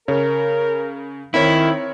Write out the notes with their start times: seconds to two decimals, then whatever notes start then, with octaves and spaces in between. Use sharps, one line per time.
0.08 C#3 A#4 C#5
1.34 D#3 C4 E4 A#4 C#5